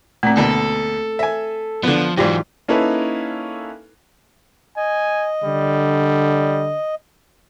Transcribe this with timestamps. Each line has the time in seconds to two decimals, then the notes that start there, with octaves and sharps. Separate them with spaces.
0.23 A#2 A3 C4
0.37 D2 B2 A#3 A4
1.19 C5 E5 G#5
1.83 D3 F3 B3
2.17 G#2 E3 F#3 F4 G4 C5 D5
2.68 A#3 C#4 D#4 E4 A4 B4
4.77 D#5 G#5
5.44 D3 G3